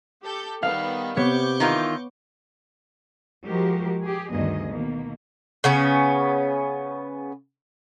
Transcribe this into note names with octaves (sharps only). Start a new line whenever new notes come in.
G4 A4 G6
D#3 G3 B3 F5
C3 B3 C#5 C#6 D6 G6
D#3 E3 F4
F3 G#3 F#4 G4 A#4
G4 G#4
D2 G2 D#3 B3 G#4 D#5
B2 D#3 A#3
C#3 B3 C#4